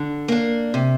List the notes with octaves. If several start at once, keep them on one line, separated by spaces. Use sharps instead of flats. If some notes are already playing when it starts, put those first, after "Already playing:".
Already playing: D3
A#3 D4
C3